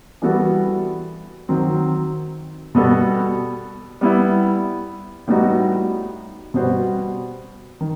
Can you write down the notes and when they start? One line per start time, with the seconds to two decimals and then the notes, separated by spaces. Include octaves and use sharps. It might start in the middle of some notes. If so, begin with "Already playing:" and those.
0.22 E3 G3 B3 F#4 A4
1.49 D#3 F#3 C4
2.75 B2 G3 B3 F#4 A4
4.01 G3 B3 E4
5.28 A2 G3 B3 D#4 F#4
6.54 B2 G3 B3 F#4 C5
7.81 D#3